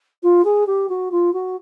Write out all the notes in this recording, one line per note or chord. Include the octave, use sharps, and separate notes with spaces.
F4
G#4
G4
F#4
F4
F#4